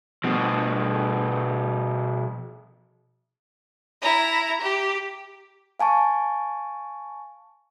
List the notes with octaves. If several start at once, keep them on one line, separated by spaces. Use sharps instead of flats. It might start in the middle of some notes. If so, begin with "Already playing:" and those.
B2 F3
E4 A#5
G4
F5 G#5 A5 C#6